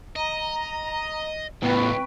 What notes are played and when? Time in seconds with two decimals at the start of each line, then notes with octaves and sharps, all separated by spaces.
0.16 D#5 A#5
1.64 C#2 A2 B3 B4 G5 C#6